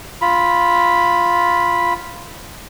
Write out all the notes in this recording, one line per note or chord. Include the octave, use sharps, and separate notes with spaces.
F4 B5